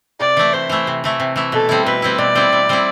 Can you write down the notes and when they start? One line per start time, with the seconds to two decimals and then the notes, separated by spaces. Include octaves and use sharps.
0.20 C3 D5
0.37 E3 A3 E4
0.53 C3 C5
0.69 E3 A3 E4
0.87 C3
1.04 E3 A3 E4
1.20 C3
1.36 E3 A3 E4
1.52 B2 A4
1.69 G3 C4 E4
1.86 B2 B4
2.02 G3 C4 E4
2.18 B2 D5
2.35 G3 C4 E4
2.53 B2
2.69 G3 C4 E4